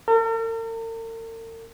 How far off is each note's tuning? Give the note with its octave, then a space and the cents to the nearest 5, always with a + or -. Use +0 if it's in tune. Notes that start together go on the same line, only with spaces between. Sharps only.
A#4 -45